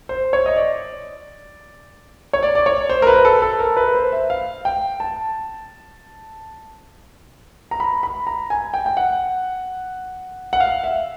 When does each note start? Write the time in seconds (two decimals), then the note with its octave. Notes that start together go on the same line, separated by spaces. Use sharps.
0.09 C5
0.33 C#5
0.46 D#5
0.56 D5
2.33 C#5
2.43 D5
2.55 D5
2.66 C#5
2.90 C5
3.02 A#4
3.07 B4
3.25 A4
3.42 A4
3.59 A#4
3.77 B4
3.95 C5
4.12 E5
4.30 F5
4.65 G5
5.00 A5
7.71 A#5
7.80 B5
8.03 B5
8.27 A#5
8.50 G#5
8.74 G5
8.86 G5
8.97 F#5
10.53 F#5
10.60 F5
10.84 E5